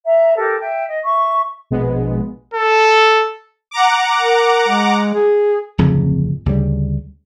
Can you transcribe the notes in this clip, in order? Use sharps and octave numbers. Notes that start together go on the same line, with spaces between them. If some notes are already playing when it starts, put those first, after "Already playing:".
E5 A#5
G4 A4 A#4
E5 G5
D#5
E5 C#6
A#1 B2 G#3 B3
A4
F#5 A#5 D6
A#4
G#3
G#4
D1 F2 C#3
D2 C#3 G3